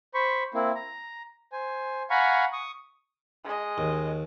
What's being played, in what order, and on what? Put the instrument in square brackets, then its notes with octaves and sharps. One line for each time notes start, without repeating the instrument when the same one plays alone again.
[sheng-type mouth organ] C5 B5 C#6
A#3 C4 E4
A#5
C5 G#5
F5 F#5 G#5 A#5 B5 C#6
C#6 D#6
[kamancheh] G#3 D#5
[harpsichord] D#2